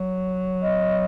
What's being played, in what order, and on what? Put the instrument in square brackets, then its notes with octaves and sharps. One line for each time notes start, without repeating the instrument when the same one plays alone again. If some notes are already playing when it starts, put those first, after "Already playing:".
Already playing: [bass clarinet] F#3
[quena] D#5